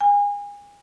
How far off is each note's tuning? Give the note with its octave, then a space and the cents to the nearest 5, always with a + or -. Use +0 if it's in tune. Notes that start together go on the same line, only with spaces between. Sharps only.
G#5 -30